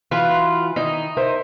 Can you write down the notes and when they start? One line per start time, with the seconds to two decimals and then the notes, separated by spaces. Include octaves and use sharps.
0.11 E3 F4 F#4 B4
0.76 D#3 D#4 E4
1.17 A#4 C5 E5